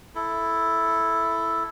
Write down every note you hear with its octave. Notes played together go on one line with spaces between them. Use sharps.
E4 A4